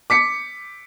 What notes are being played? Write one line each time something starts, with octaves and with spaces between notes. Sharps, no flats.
D6 B6 C#7